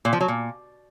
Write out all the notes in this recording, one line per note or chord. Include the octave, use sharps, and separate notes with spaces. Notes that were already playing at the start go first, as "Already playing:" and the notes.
A#2
F3
F#3
A#2